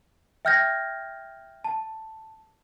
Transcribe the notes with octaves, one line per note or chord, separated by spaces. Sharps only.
E5 G5 F6 G6 G#6 A#6
A5